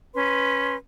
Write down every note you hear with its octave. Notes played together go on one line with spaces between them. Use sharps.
C#4 B4 C6